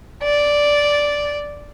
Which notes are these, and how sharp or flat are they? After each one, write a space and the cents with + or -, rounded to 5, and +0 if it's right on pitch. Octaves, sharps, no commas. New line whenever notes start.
D5 -5